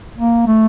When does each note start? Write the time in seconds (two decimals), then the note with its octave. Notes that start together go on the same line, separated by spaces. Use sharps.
0.18 A#3
0.47 A3